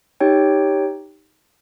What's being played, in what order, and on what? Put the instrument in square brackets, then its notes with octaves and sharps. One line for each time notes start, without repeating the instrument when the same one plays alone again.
[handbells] D#4 G4 C#5 G5